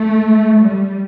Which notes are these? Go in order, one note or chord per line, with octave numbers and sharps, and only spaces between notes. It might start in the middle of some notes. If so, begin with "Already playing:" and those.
Already playing: A3
G3